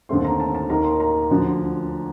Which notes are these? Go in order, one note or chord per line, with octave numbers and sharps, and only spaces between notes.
D#2 D3 A3 C4 C6
A#5
A5
A5
D#2 D#3 A#3 A#5
C6
A#5
D2 D3 F3